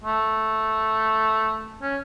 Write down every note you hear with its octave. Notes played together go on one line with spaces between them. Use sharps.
A3
C#4